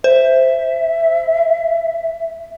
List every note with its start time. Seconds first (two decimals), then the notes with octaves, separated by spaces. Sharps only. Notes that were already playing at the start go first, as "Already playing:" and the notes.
0.04 C5 E5